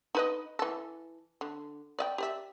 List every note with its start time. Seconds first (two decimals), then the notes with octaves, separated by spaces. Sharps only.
0.15 D#4 B4 D#5
0.59 E3 A4
1.41 D3
1.99 D5 D#5 G5
2.18 G4 D5 E5